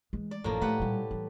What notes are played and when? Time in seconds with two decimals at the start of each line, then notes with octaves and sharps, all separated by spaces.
0.13 E3 G#3
0.31 D5
0.44 A1 F#2 A2 F3 A#3
0.61 A3 G4 B4 F#5
0.79 A#2 G3
1.11 E3 G3